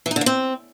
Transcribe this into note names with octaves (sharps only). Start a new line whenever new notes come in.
E3
D#4
D3
A#3
C4